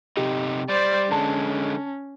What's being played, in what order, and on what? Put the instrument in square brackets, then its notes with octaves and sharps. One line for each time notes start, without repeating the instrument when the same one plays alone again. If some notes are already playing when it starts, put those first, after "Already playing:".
[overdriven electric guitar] C3 D#4 [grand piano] G4
[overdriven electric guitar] G3 [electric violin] C5 D5
[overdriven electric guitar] D3 G#3 [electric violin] C#4 [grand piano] A5